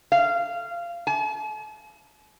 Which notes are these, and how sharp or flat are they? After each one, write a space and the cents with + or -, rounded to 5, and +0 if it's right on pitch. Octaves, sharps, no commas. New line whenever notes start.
F5 -20
A5 -45